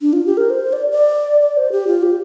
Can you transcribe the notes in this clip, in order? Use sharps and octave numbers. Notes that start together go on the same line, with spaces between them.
D4
F4
G4
A#4
C5
D5
D5
D5
C5
G4
F4
G4